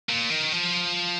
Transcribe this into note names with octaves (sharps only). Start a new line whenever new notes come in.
A#2
D#3
F3